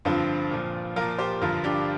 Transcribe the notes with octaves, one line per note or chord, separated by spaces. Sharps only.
G2 D3 F3 C4 F4
A#2 F3
A#2 F3 F4 A#4
G4 C5
G2 D3 F3 F4 A#4
D4 G4